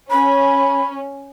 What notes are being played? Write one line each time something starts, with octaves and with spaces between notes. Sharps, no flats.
C#4 B5